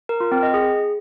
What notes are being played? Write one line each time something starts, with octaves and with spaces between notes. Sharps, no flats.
A#4
F4
C4
D#5
G#4